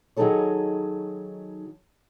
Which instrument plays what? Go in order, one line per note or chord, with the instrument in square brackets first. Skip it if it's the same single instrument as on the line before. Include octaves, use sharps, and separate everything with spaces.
[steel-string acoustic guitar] D#3 F#3 D#4 G#4 A4 C#5